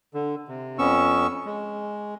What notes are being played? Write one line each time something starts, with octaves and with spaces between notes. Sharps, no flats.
D3
C3
F2 B3 C#4 C#6 E6
G#3